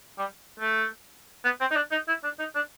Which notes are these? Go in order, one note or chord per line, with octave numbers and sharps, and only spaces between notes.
G3
A3
B3
C4
D#4
D4
D#4
E4
D4
D#4
D4